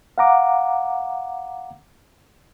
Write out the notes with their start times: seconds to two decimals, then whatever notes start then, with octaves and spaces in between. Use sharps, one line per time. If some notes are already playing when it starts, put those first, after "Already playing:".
0.18 F5 F#5 A#5 D6